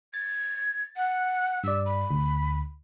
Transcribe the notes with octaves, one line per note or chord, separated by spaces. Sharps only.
G#6 A6
F#5
G2 D5 E6
B5
D2